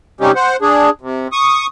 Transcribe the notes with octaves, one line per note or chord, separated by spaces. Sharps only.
C3 G3 C#4 D#4 G4
C5 F#5
D4 G#4
C3
C#6 D#6